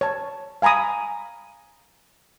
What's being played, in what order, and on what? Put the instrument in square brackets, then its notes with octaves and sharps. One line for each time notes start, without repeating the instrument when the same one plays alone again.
[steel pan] C#5 A5
F5 G#5 A#5 B5 D#6